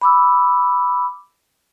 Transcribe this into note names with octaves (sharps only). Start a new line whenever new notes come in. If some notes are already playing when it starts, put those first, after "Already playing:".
B5 D6 E6